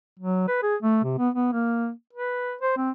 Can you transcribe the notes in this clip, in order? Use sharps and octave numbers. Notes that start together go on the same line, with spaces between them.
F#3
B4
G#4
A3
C3
B3
B3
A#3
B4
C5
C4